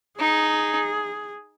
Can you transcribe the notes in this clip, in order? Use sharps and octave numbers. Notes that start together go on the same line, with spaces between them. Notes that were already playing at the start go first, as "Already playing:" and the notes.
D#4 G#4